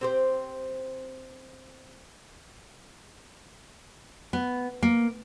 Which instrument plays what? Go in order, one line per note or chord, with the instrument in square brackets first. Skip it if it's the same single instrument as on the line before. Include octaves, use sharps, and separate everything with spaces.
[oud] C4 G4 C5
[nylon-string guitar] B3
A#3